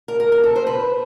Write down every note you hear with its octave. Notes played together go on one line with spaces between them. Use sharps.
A#4
A#4
A#4
A4
C5
B4